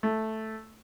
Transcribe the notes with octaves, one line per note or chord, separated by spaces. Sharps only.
A3